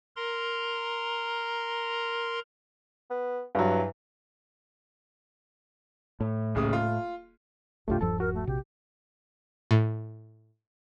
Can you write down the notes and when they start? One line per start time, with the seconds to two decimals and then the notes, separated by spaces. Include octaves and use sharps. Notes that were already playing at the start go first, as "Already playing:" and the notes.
0.16 A#4 A#5 C6
3.10 B3
3.55 G2 E3 F#3
6.20 A2
6.55 D#1 C#3 D#6
6.73 F4
7.88 A#1 F#2 B2 A3 D4 F4 G4
8.01 D#1 G2 F3 A4 A5
8.20 F#4 A#4
8.34 A3
8.47 A#1 C3 G4
9.71 A2